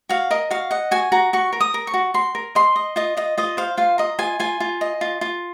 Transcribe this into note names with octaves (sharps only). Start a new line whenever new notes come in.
F#4 F5
A#4 D#5
F#4 F5
D#5 F#5
F#4 G#5
F#4 A#5
F#4 C#6
A#4
D#6
A#4
C#6
F#4
F#4 C6
A#4
D#5 C6
D#5
F4 D#5
F4 D#5
F4 D#5
C5 F5
F4 F5
D#5 A#5
F4 G#5
F4 G#5
F4
D#5
F4
F4